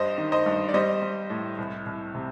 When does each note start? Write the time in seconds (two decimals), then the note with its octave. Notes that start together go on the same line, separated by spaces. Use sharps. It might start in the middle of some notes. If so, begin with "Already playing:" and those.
Already playing: G2 G3 C5 D#5
0.18 D#3
0.32 C5 D#5
0.46 G2
0.69 D5
0.74 G3 C5 D#5
1.02 G3
1.30 A2
1.58 C2
1.86 C2
2.15 C3